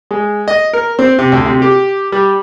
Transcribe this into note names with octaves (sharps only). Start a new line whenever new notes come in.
G#3
D#5
A#4
C4
C3
D2
C3
G4
G3